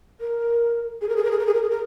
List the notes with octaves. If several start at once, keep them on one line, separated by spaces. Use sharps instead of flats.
A#4
G#4
A#4
G#4
A#4
G#4
A#4
G#4
A#4
G#4
A#4